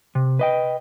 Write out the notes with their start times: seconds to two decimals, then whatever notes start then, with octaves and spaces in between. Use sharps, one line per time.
0.15 C3
0.39 B4 D#5 G5